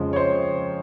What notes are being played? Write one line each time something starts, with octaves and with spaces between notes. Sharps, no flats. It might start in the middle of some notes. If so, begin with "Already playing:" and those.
Already playing: F2 C#3 F3 G#3
C#5
C5